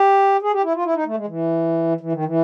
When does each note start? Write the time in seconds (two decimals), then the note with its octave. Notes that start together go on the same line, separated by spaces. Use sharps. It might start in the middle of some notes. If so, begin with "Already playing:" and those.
Already playing: G4
0.42 G#4
0.53 G4
0.63 E4
0.74 F4
0.85 E4
0.95 D#4
1.06 A3
1.17 G#3
1.27 E3
2.01 E3
2.12 D#3
2.25 E3